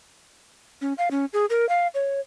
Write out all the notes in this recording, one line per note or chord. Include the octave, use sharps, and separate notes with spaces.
C#4
F5
C#4
G#4
A#4
F5
C#5